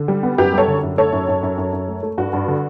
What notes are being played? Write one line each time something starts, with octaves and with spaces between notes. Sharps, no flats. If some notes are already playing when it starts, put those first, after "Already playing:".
Already playing: D3
G3
B3
F#2 G4 B4
G3 A4 C#5
D3
F#2
A3 A4 C#5
F#2
F#2
F#2
F#2
F#2
A3
A3
G2 F#4
G2
D3